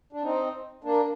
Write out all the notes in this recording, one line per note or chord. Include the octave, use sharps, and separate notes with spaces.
D4
C4 D#4
A#3 D4